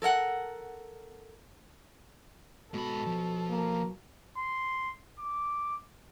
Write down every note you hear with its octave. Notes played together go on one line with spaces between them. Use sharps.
A4 A#4 F5 F#5
G#2 B2 A4 B5
F3
A#3
C6
D6